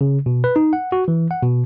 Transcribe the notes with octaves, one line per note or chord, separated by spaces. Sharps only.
C#3
B2
B4
D#4
F#5
F#4
E3
F#5
B2